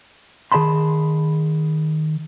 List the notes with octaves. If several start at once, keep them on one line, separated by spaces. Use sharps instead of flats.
D#3 G#4 D#5 A5 B5 C6